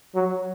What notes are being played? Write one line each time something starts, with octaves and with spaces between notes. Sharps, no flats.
F#3